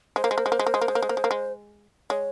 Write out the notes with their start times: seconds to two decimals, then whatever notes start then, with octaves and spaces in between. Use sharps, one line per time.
0.16 G#3 C5
0.24 A#3
0.31 G#3
0.38 A#3
0.46 G#3
0.52 A#3
0.59 G#3
0.67 A#3
0.74 G#3
0.81 A#3
0.88 G#3
0.95 A#3
1.02 G#3
1.09 A#3
1.17 G#3
1.24 A#3
1.31 G#3
2.10 G#3 C#5